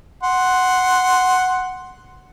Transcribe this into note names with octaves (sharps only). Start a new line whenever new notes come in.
F#5 C6